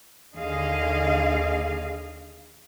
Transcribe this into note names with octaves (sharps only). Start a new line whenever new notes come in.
D#2 D3 G#4 D#5 F5